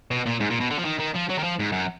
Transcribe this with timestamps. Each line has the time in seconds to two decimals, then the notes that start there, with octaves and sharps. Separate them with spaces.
0.11 B2
0.26 A#2
0.40 G#2
0.50 A#2
0.60 B2
0.71 D3
0.79 F3
0.85 D#3
1.00 D#3
1.15 F3
1.30 F#3
1.39 D#3
1.44 F3
1.60 G#2
1.72 F#2